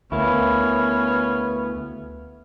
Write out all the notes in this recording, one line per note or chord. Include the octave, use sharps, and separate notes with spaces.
D2 A#3 B3 C#4 E4